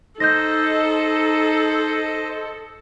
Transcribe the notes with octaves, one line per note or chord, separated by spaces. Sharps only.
D#4 A4 C5 D#5 G6 A#6